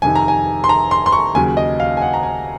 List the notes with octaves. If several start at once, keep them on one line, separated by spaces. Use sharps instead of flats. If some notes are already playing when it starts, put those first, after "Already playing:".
F2 C3 D#3 G#5
A#5
G#5
C6
A#5
C6
C6
C#6
D#2 C#3 F#3 G#5
D#5
F5
G#5
F#5
A#5
G#5